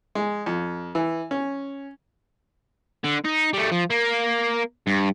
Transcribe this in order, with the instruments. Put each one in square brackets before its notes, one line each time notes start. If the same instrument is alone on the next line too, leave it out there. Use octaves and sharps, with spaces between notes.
[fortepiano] G#3
F2
E3
C#4
[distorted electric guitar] D3
D#4
G3 A3
F3
A#3
G2